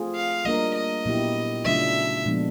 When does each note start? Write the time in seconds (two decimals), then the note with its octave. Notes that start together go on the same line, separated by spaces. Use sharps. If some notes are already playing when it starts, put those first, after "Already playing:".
Already playing: A3 C4 F4 G#4
0.16 F5
0.45 G3 A#3 D4 F4 A#4 D#5
0.76 D#5
1.05 A#2 F#3 B3 E4 G4
1.65 C#3 F#3 A3 D4 F4 E5
2.25 A#2 F3 G#3 B3 D4